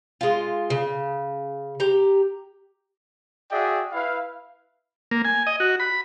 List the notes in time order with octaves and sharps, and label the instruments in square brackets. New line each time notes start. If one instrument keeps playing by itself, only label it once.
[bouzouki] G#3 F4
C#3
G4 A#5
[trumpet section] F#4 G#4 D5 E5 G5
E4 B4 F5
[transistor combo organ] A#3
G#5
D#5
F#4
B5